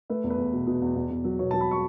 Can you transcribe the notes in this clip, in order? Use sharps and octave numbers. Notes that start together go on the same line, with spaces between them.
A3 B4
E2
B4
E2
B2
B2
E2
E2
E2
F#3
B2 C#5
F#3 A5
B5
C#6